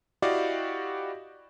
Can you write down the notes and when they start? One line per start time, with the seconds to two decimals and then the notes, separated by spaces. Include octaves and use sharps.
0.22 E4 F#4 G4 D5 D#5 F5